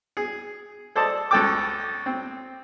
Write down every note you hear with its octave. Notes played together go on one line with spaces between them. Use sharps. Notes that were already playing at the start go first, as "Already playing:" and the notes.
G#4
A4 C5 D5 D#5 A5
C#2 A4 G5 D6
C4